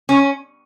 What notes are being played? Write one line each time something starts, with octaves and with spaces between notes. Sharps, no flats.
C#4